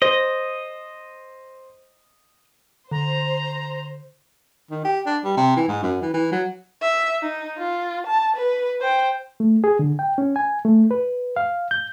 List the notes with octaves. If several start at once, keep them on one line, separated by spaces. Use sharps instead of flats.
C5 D#5
D3 C5 A#5
D#3
G4
D4
G3
C3
E3
G#2
F#2
E3
E3
F#3
E5
D#4
F4
A5
B4
C5 G5
A3
G#4
D3
G5
C#4
G#5
A3
B4
F5
G6